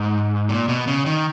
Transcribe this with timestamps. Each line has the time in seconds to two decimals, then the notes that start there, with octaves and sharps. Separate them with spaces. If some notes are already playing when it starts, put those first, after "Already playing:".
Already playing: G#2
0.49 A#2
0.69 B2
0.87 C#3
1.06 D#3